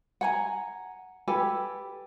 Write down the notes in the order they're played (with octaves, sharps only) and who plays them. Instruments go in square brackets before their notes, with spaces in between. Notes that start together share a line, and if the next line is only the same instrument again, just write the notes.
[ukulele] F#5 G#5 A#5
G4 A4 B4 G#5